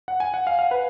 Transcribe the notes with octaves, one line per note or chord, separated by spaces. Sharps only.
F#5
G#5
F#5
F5
F5
B4